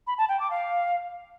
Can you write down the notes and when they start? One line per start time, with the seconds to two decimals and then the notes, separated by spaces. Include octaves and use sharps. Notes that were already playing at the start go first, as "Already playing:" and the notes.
0.07 B5
0.18 A5
0.29 G5
0.40 D6
0.51 F5